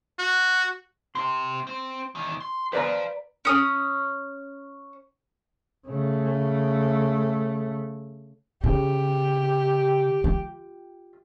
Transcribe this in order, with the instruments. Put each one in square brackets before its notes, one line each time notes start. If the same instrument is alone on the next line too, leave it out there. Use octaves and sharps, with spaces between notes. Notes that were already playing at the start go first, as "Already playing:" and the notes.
[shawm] F#4
[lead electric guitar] C4 G4 [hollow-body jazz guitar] C6
[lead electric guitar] C4
E2 D#3
C6
[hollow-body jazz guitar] B4 D5 A#5 [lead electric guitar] C5 F5
[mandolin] C#4 D#6
[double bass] C#3 A3
[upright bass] C#3 [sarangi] G4
[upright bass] F4